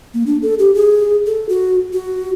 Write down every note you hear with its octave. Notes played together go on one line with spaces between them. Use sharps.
A#3
D4
A4
G4
G#4
A4
F#4
F#4